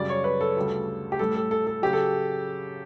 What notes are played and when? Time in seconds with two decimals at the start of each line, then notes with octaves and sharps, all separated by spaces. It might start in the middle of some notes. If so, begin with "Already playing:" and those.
Already playing: F#2 C#3 G3 D5
0.09 C#5
0.24 B4
0.41 A4
0.57 D2 C#3 G3
1.12 G4
1.19 A2 G3 A4
1.35 A4
1.51 A4
1.67 A4
1.82 C#3 F#3 G4
1.93 A4